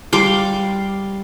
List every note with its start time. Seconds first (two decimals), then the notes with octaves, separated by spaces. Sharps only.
0.13 G3 F5 C6 D6